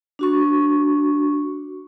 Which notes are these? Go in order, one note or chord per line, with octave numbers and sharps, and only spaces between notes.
D4 F#4 C#6